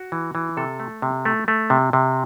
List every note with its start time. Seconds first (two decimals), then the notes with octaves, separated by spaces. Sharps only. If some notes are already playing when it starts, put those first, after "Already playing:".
Already playing: F#4
0.12 E3
0.35 E3
0.57 C3 A4
0.80 A3
1.02 C3
1.25 A3
1.48 A3
1.70 C3
1.93 C3